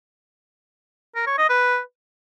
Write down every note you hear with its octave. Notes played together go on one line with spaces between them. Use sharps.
A#4
C#5
D#5
B4